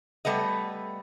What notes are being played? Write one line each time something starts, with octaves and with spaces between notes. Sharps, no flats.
G3 A3 B3 D#5